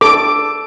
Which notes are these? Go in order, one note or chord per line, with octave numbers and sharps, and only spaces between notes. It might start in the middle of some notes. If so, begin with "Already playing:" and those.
A4 D6